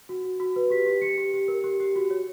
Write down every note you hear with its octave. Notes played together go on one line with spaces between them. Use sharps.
F#4
F#4
F#4
B4
G4 B6
G4
G4 C#7
G4
G4
A#4
G4
G4
F#4
C#5